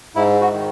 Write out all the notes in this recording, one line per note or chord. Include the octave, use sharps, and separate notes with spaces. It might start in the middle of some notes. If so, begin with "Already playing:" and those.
G#2 E4
F#4
D#3